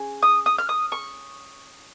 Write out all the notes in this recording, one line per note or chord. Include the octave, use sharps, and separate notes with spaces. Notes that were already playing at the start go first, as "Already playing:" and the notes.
Already playing: C#4 G#4
D#6
D#6
F6
D#6
C#6